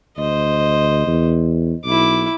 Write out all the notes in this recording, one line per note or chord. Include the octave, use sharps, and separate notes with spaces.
D2 C5 D#5
E2
B1 E4 D6